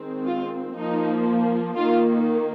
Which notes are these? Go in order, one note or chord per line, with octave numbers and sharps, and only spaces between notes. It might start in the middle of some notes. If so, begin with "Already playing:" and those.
Already playing: D#3 G#3 C4
F4
F3 A#3 D#4
D#3 A#3 F4